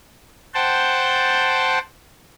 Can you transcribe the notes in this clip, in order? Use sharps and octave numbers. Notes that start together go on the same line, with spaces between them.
C5 F#5 G5 A5